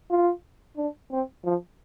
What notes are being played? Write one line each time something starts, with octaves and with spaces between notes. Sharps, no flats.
F4
D4
C4
F3